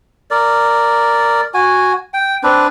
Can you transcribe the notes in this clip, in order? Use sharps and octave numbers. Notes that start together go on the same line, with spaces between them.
A#4 D5
F#4 G#5
G5
C4 D4 B4